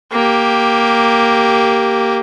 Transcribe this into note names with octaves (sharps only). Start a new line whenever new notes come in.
A#3 G4